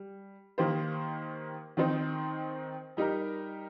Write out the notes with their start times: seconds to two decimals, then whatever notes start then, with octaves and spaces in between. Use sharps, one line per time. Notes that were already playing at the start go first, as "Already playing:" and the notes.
Already playing: G3
0.58 D#3 A#3 G4 C5
1.77 D#3 C4 D#4 C5
2.97 G3 D#4 G4 A#4